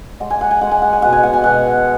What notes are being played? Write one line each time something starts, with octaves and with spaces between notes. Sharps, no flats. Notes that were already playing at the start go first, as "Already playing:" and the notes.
G#3 F#5
G#5
F#5
G#5
G#3 F#5
G#5
F#5
G#5
B2 F#5
G#5
F#5
G#5
B2 F#5